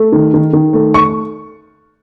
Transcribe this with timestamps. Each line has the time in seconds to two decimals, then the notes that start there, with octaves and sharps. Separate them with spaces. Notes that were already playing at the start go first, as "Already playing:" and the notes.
Already playing: A3
0.12 D#3
0.34 D#3
0.53 D#3
0.73 A3
0.94 C#6